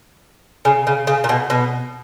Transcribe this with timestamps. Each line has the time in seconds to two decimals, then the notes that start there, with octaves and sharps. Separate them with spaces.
0.65 C#3
0.87 C#3
1.07 C#3
1.24 A#2
1.29 B2
1.50 B2